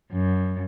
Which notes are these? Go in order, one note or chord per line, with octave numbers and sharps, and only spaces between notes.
F#2